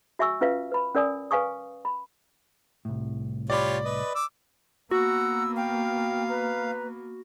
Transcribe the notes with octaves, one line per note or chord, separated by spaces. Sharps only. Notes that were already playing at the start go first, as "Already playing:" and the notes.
F#4 E5 G#5 C#6 E6
C#4 F4 B4 E5 F5
B4 B5
C#4 A#4 D5 G#5 D#6
B4 F5 G#5 C#6 D#6
B5
C2 A2
F4 G4 C#5 D5 B5
B4 D#5
D6 E6
A#3 B3 F#4 F#5 A#5 E6
F5 G5
B4 A#5